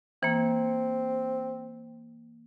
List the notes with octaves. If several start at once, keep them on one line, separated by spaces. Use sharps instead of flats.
E3 A#3 C4